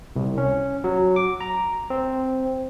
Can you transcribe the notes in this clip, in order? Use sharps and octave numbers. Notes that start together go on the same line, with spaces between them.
C2
C#4
F#3
D6
A#5
C4